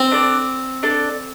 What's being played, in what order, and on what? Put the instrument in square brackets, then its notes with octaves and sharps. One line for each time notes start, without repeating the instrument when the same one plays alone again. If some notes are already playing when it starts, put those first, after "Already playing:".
Already playing: [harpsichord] C4
[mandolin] D4 A4 D5
D4 A4 D5